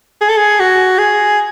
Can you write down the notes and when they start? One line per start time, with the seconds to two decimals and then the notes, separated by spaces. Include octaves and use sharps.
0.21 G#4
0.29 A4
0.37 G#4
0.60 F#4
0.98 G#4